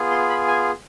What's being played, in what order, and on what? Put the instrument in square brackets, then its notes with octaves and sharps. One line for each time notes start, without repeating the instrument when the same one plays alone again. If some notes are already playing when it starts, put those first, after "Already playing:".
Already playing: [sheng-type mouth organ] B3 F4 G#4
C6
B5
G#5